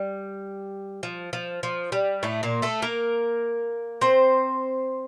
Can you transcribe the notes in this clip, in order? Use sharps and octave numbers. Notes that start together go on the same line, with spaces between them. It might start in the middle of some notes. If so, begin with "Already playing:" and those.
Already playing: G3
F3
F3
F3
G3
A2 A3
A#2 A#3
A3 A4
A#3 A#4
C4 C5